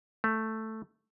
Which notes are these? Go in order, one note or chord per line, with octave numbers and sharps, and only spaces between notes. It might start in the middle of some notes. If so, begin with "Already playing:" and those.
A3